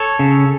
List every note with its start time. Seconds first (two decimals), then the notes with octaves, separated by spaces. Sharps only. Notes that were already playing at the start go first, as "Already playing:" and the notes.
Already playing: A4 C#5
0.19 C#3